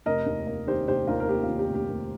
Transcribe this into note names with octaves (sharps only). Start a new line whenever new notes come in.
F1 A#4 D#5
D#2
A#3
D#3 G4 C5
F1 G4 C5
D#2 F4 A#4
A#4
A#3 G4
F4
D#3
G4
F1
G4
D#2